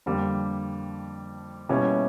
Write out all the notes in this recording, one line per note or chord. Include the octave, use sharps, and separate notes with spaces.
F2 D3 G3 A#3 D4
B2 G3 A#3 C#4 E4